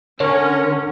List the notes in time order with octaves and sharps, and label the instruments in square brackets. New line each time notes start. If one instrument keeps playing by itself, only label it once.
[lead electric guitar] D3 [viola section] C#4 [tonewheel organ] A#4 F6 A#6 [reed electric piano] C#5